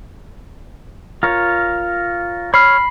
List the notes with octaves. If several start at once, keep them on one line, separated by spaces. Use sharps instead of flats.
F4 A#4 C#5
C#5 B5 F6 C7